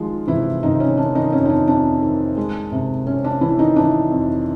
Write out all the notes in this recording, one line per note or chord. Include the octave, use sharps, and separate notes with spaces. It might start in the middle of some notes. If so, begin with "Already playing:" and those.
Already playing: D#3 F3 G#3 F4
C3 E3 E4
C3 D#3 D#4
C#4
D#3 D4
D#3 D#4
F2 C#4
D#4
D4
F2 D4
D#3
G#3
C3
C3 C#4
D4
E3 E4
D#3 D#4
E3 D4
F2